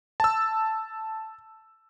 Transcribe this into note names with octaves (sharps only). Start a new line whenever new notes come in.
A5 E6